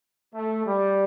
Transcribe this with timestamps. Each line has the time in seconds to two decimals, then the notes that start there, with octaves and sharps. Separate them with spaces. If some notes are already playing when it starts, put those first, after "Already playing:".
0.34 A3
0.66 G3